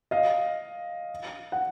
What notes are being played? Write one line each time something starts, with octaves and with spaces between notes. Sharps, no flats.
D#5 F5
F#5